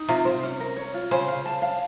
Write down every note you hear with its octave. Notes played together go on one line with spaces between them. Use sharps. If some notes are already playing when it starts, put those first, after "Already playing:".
Already playing: D#4
C3 F4
C5
C#4
A#4
C#5
F4
C#3 C5
F5
A5
F5